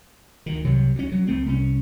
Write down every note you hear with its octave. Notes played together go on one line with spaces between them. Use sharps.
D2 D#3
C2 C3 F#3
D2 C#4
D2 F#3
C#2 A3 C4
C2 C#4